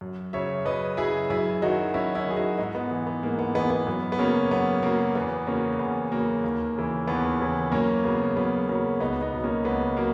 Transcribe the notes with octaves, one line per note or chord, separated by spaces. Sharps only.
F#2
C#3 F#3 C#5 E5
F#2 B4 D#5
C#3 F#3 E4 G#4
F#2 E4 G#4
D#3 F#3 D#4 F#4
F#2 C#4 E4
C#4 E4
D#3 F#3 G#4
D#4 F#4
G#2 D#4 F#4
B3
E3
B3
G#2 A#3
B3
E3 B3 D#4
B3
F#2 B3
B3
C#3 F#3 A#3 C#4
F#2 B3
C#3 F#3 A#3
E2 B3
C#3 F#3 A#3 C#4
E2 B3
C#3 F#3 A#3
D#2
C#3 E3
D#2 B3
C#3 E3
F#2 A#3 C#4
C#3 F#3 B3
F#2 B3
C#3 F#3 A#3 C#4
C#2 B3 D#4
B3 D#4
B2 F#3
A#3 C#4
C#2 B3
F#3 A#3